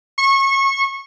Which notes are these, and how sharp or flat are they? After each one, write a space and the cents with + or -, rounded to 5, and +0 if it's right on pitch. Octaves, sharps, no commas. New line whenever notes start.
C#6 -25